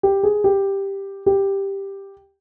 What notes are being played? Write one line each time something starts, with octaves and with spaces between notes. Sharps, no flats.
G4
G#4
G4
G4